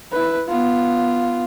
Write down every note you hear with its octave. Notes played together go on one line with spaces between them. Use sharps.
E4 B4
B3 F4